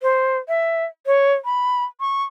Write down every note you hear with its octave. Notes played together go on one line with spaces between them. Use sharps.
C5
E5
C#5
B5
C#6